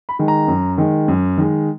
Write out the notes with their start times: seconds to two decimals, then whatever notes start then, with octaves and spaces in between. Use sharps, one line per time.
0.09 B5
0.19 D#3 G#3
0.28 A#5
0.48 F#2
0.78 D#3 G#3
1.08 F#2
1.38 D#3 G#3